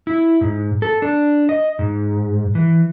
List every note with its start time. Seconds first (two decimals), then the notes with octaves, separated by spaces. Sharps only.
0.07 E4
0.41 G#2
0.82 A4
1.02 D4
1.49 D#5
1.79 G#2
2.55 E3